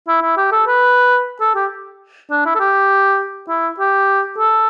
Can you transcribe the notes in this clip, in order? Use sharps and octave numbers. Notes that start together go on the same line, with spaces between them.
E4
E4
G4
A4
B4
A4
G4
D4
E4
A4
G4
E4
G4
A4